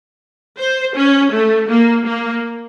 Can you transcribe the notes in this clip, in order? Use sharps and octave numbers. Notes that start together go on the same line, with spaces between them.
C5
C#4
A3
A#3
A#3